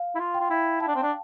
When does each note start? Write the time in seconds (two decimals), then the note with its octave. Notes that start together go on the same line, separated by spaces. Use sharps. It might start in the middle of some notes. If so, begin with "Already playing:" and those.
Already playing: F5
0.15 E4
0.20 F4
0.34 G5
0.41 F4
0.50 E4
0.80 E4 A5
0.88 D4
0.96 C4
1.03 D4